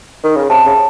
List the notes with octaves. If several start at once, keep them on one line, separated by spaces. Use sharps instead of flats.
D#3
C#3
C3 A5
C#3